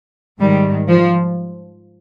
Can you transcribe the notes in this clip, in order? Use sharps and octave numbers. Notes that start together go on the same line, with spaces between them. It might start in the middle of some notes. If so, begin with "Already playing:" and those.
G#2 D#3 G3
F3